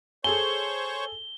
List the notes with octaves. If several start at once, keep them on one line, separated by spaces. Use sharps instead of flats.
G#4 A4 C5 C#5 G#5 C#6 G7